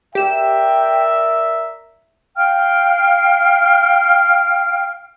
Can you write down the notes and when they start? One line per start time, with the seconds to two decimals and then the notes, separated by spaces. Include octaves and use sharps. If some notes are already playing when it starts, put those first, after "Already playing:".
0.15 G4 A#4 D5 E5 G5 E7
2.36 F5 G5 F6